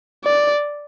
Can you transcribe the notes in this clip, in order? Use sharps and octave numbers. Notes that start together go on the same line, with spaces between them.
D5